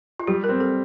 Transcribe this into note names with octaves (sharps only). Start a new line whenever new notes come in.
F4
G3 G4
A#4
C4
A4